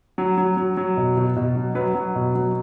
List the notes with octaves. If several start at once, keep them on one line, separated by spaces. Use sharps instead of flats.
F#3
F#3
F#3
F#3
B2
B2
B2
F#3
F#3 B4
F#3
B2
F#3